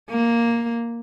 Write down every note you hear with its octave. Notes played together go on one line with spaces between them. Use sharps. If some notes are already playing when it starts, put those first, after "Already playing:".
A#3